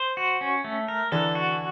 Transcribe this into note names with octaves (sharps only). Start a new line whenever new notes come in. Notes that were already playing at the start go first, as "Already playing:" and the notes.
Already playing: C5
F#4
C#4
A3
A#4
D3 E3 A4
F#4